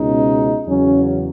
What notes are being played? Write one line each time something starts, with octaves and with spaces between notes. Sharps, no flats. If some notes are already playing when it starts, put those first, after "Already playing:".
Already playing: C#2 B2 G#3 C#4 D#4
E2 C#3 F#3 C#4